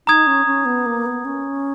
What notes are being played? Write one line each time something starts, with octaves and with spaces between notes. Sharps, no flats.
D#4 A#5 D#6 G#6
C#4
C#4
B3
A#3
B3
C#4